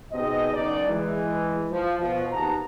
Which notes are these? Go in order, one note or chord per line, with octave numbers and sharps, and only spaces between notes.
B2 C4 D#4 G#4 D#5
F#1 B1 D#4 D5
E3 G#3
F3
B2 F3
D#2 G#2 B3 A5 A#5